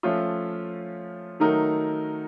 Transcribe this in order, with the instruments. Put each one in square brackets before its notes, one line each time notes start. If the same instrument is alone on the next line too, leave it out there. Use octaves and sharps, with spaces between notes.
[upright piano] F3 A3 C#4 F4
D#3 F#3 A3 D#4 A#4